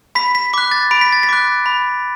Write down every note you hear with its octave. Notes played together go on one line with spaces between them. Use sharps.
B5 B6
B6
D6 F#6 B6
A6
B5 D7
B6
A6
B6
D6 F#6
B5